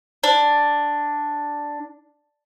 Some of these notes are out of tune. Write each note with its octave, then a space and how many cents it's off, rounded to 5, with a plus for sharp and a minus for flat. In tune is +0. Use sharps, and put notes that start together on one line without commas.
D4 +0